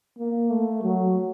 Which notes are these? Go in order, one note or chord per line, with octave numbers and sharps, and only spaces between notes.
A#3
A3
F#3